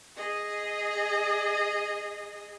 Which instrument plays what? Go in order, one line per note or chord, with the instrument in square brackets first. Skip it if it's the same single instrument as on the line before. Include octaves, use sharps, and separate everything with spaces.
[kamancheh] G#4 D#5